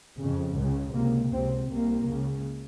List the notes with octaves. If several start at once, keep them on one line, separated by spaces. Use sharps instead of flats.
F2 C#3
C#2
C#3
C#2 C3 A#3
C#2 C3 C4
C2 C3 A#3
C#2 C#3